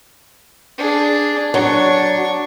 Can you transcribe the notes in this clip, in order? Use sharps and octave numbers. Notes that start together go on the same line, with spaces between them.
D4 G#4
F#3 D4 C#6